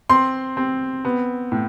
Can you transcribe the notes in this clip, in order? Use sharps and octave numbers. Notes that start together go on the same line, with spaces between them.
C4 C6
C4
B3
A2